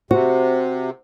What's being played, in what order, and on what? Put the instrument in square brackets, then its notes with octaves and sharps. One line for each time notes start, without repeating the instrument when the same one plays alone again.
[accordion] C3 [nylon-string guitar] F#4 [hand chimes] C5